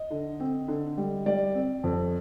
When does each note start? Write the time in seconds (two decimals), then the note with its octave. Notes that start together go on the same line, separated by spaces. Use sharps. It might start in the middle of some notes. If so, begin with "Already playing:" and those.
Already playing: D#5
0.10 D3
0.40 C4
0.68 D3
0.98 G3
1.26 G3 D5
1.55 C4
1.84 F2